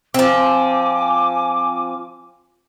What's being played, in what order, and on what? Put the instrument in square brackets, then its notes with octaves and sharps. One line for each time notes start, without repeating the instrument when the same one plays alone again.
[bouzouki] F3 C4 [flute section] G#5 D6